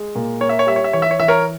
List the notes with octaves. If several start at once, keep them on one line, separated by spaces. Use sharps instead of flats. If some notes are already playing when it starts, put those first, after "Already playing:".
Already playing: G#3
A#2
A#3 C#5
E5
C#5
G3 E5
C#5
E5
E3 C#5
E5
C#5
E3 E5
A#4 C#5